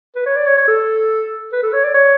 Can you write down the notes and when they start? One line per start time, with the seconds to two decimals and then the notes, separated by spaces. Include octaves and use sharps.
0.16 B4
0.26 C#5
0.36 D5
0.47 C#5
0.57 C#5
0.68 A4
1.52 B4
1.63 A4
1.73 C#5
1.84 D5
1.94 C#5